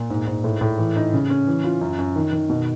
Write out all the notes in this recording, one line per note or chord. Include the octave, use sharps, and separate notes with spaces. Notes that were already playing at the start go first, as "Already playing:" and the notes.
Already playing: A#2
G#2
G#2
A2
A2
E3
D#4
C#3
C#4
E3
F4
F#2
F#2
D#3
D#3
B2